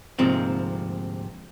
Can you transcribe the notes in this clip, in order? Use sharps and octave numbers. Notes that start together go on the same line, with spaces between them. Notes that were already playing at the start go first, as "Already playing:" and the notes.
D2 G#2 C3 F3 A#3 C4